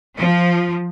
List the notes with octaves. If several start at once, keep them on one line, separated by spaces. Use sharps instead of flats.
F3